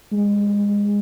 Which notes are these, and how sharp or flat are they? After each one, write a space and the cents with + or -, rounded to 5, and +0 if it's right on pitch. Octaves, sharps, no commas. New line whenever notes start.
G#3 -30